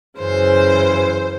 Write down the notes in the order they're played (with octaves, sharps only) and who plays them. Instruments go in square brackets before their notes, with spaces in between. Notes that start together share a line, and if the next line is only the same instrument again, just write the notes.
[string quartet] F#2 C#3 E3 C5